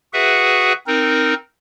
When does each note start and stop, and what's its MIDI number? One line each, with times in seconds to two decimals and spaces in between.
0.13 0.73 66
0.13 0.73 68
0.13 0.73 71
0.13 0.73 76
0.13 0.73 78
0.87 1.34 60
0.87 1.34 63
0.87 1.34 70